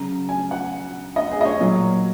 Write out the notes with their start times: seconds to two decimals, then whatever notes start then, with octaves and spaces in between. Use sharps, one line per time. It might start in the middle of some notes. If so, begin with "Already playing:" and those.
Already playing: C#3 F#3 A#5
0.29 G#5
0.51 F#5
1.16 D#5
1.31 G#4
1.41 D#5
1.45 C#5
1.60 A#2 F#3